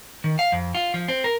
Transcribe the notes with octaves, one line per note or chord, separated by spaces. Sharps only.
D#3
F5
F2
F4
F3
C4
A#4